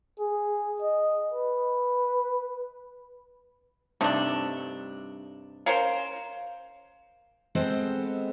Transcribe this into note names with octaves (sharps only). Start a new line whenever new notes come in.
G#4
D#5
B4
G2 C3 A3 D4 D#4
C#4 A#4 C5 F5
G#3 B3 C4 G4 A4 C5